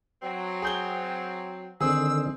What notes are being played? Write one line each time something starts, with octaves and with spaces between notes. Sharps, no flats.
F#3 C4
G#4 G6 G7
D3 D#3 C4 G#4 E6